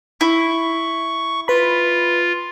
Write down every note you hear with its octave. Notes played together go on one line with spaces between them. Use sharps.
E4 C#6
F4 B4 B5